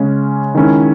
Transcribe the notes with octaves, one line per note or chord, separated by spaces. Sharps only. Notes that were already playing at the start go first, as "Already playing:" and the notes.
Already playing: C#3 G#3 C#4
D#3 G#3 C#4 E4